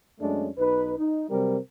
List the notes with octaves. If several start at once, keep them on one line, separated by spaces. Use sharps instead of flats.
F#2 G#3 A3 C#4 D4
B1 D#4 B4
D#4
C3 F#3 G3 C4 A#4